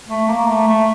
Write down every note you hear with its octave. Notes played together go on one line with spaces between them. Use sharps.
A3
A#3
A3
A3